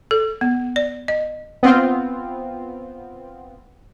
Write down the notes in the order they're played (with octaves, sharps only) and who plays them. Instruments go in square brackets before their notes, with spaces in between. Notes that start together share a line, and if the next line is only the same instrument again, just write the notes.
[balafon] A4
B3
D5
D#5
[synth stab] B3 C4 F4